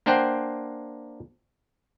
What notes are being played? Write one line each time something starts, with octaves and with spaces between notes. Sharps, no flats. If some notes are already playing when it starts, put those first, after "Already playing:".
A#3 D4 C5 F#5 G5